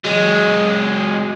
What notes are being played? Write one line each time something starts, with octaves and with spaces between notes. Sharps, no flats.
F#3 G#3